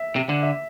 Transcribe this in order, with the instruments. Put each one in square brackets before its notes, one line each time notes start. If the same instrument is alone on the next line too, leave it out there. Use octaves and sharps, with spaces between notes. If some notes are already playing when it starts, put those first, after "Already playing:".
Already playing: [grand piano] E5
[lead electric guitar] C3
D3
[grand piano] E5